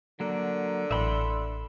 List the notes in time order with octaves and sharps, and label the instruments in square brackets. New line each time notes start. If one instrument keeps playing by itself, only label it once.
[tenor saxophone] D3 [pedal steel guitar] F#3 A#3
[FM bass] A1 [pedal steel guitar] E5 B5 C6